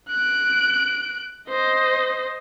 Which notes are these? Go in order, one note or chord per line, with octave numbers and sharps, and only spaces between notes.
F#6 D7
C5 D#5